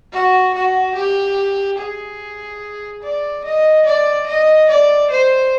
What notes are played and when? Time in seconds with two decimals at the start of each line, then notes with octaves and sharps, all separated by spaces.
0.13 F#4
0.54 F#4
0.95 G4
1.78 G#4
3.02 D5
3.44 D#5
3.86 D5
4.27 D#5
4.69 D5
5.11 C5